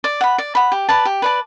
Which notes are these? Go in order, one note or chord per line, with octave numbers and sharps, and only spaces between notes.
D5
F#5 B5
D5
F#5 B5
G4
B4 D5 A5
G4
B4 D5 A5